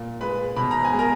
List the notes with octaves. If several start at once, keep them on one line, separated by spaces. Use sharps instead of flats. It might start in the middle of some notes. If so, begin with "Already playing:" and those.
Already playing: A#2
G#3 B4 B5
B2 B5
A#5
G#5
G#3
A#4 A#5